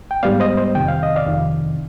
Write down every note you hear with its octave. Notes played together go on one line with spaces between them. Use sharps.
G5
G#2 G3 B3 D5 F5
C5 D#5
C5 D#5
F2 C3 D#3 G5
F5
D#5
D5 F5
F2 C3 D#3